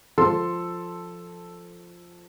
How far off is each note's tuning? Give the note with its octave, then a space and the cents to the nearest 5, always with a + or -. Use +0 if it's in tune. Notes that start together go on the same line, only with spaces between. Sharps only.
F3 +0 A4 +0 C6 +0